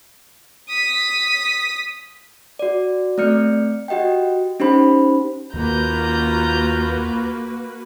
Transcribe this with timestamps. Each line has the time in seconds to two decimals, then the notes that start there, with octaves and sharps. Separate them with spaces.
0.69 D#6 B6
2.59 F#4 D5
3.18 A3 C4 D5 F6 G6 C#7
3.88 F#4 G4 D#5 F#5 G5
4.60 C#4 D#4 G4 C5 B5
5.54 D#2 A#3 F4 F#4 B4 A#5 G6